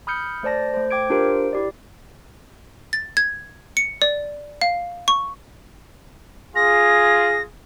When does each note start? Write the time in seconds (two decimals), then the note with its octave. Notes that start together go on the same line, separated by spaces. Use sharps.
0.07 B5 D#6 F6 G6 C#7
0.43 A3 C5 D5 A5 A#6
0.74 A3 C5
0.91 G5 D6 G#6 D7
1.10 D4 F4 G4 A#4 C5 D7
1.53 E4 G4 D5
2.93 A6
3.17 G#6
3.77 C#7
4.02 D5
4.61 F5
5.08 C#6
6.55 F4 G#4 A#6